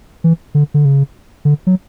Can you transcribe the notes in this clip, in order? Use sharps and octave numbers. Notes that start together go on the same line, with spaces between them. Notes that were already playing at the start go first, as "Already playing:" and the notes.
E3
D3
D3
C#3
D3
F#3